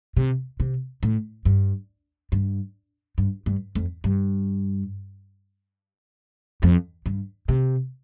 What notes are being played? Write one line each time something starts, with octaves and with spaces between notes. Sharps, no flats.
C3
C3
A2
G2
G2
G2
G2
F2
G2
F2
G2
C3